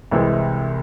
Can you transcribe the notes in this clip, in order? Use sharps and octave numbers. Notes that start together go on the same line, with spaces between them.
C2 C3 E3 G#3